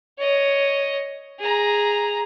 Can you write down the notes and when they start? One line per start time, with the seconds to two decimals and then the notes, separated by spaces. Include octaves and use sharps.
0.18 C#5 D#5
1.39 G#4 A#5